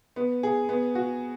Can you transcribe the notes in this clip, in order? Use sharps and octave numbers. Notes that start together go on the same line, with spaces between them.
B3
G#4
B3
F#4